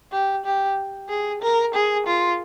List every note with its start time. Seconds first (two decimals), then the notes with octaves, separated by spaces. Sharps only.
0.12 G4
0.45 G4
1.09 G#4
1.42 A#4
1.74 G#4
2.07 F4